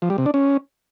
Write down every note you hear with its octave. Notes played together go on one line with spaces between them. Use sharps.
F3
G3
C3
D4
C#4